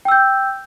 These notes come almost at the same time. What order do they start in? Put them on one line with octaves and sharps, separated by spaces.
G5 E6 G6